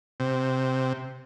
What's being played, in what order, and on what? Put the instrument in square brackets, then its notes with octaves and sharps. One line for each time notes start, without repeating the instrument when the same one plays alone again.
[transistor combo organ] C3